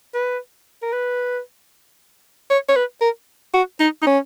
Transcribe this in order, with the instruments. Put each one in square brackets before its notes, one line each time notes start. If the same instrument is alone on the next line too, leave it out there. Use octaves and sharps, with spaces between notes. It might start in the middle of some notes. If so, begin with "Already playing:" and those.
[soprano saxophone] B4
A#4
B4
C#5
C#5
B4
A#4
F#4
D#4
D#4
C#4